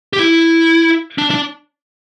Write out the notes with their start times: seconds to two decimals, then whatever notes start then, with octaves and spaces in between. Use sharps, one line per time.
0.13 G4
0.19 E4
1.18 D4
1.31 D4